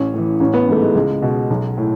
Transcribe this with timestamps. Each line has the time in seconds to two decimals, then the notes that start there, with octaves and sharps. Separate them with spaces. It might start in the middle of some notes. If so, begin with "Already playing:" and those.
Already playing: A1 C#4
0.14 A2 E3
0.40 A1 C#4
0.54 B3
0.67 G#2 E3 A3
0.82 G#3
0.95 C#2 G#3
1.22 B2
1.50 B1
1.78 A2